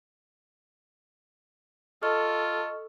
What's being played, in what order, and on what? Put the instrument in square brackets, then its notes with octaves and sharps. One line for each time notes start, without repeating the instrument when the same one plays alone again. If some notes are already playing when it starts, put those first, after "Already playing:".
[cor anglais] F4 [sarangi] A4 [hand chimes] D#5 C#6 F6